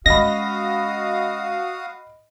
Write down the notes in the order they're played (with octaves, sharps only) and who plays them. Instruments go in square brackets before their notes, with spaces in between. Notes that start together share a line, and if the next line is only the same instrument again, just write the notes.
[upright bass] G#3 C#4 [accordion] F#4 F5 D#6 [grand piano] D#5 B5 [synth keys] A#6